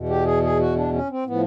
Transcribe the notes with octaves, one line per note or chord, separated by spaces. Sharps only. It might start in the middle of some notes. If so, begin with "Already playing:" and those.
Already playing: E2 B2
G4
G#4
G#4
F#4
D4
C#4
C4
A2 F3 B3